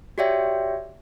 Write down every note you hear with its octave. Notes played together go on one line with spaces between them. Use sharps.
F#4 G4 C#5 D5 E5 G5